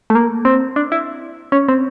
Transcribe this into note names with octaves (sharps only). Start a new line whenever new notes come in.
A3
A#3
C4
D4
E4
C#4
C4